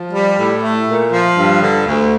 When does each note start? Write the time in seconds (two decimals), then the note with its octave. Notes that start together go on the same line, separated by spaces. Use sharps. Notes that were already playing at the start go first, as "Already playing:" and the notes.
Already playing: F3
0.12 G3
0.37 A2
0.62 A3
0.87 A#2
1.12 F3
1.37 G2
1.62 D3
1.87 D2